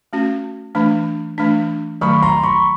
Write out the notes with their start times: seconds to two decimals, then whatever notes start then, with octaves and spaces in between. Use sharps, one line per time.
0.13 A3 C#4 F#4
0.75 E3 A3 D4
1.38 E3 A3 D4
2.01 D#3 F#3 A3 B5 C#6
2.22 A#5 C6
2.43 B5 C#6